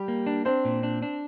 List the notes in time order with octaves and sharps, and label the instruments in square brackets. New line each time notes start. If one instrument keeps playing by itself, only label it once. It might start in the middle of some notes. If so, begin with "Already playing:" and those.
Already playing: [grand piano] G3 G4
[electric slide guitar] A#3
D4
[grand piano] C4 C5 [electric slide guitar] D4
[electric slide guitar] A#2
D4
D4